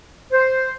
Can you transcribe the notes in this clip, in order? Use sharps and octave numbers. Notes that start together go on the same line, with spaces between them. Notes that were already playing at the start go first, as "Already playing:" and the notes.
C5